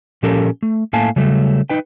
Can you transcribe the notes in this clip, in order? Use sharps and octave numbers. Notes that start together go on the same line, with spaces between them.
A#2 F3 C#4 G4 A4 A#4
A3
A2 A3 A#3 F5 G#5 A5
C#3 F#3 G3 A3
D#4 B4 G5